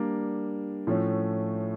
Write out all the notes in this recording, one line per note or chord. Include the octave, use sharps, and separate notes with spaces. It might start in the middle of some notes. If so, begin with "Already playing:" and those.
Already playing: G3 A#3 D4
A2 F3 A3 C#4